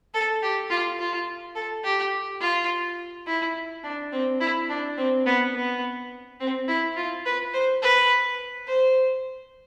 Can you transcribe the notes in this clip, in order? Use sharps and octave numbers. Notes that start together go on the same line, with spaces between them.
A4
G4
F4
F4
A4
G4
F4
E4
D4
C4
E4
D4
C4
B3
B3
C4
E4
F4
B4
C5
B4
C5